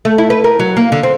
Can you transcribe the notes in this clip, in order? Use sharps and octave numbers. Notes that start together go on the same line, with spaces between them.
A3
E4
B4
A#4
F#3
A#3
D3
C4